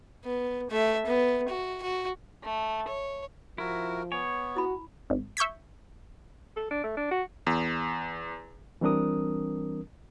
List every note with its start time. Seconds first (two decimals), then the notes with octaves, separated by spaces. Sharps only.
0.24 B3
0.70 A3 E5
1.06 B3
1.48 F#4
1.82 F#4
2.43 A3
2.88 C#5
3.58 F3 E4 F#4 A#4
4.12 B3 C#5 G#5
4.57 E4 F#4 B5
5.10 G#1
5.37 E5 C#6 G6 G#6 B6
6.57 A4
6.71 D4
6.83 A3
6.97 D4
7.11 F#4
7.47 E2
8.81 E3 G3 C4 D4 A#4 D#6